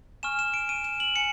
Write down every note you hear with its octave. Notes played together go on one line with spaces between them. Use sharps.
G#5 C#6 F6 E7
E7
D7
D#7
E7
F#7
G#5 C#7